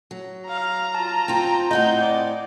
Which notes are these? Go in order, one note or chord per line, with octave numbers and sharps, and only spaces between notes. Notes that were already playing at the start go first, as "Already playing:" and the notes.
F#3
F5 A#5
F4 A5
C4 F4 G5
A2 C4 G#4 D#5 F#5 G6
D5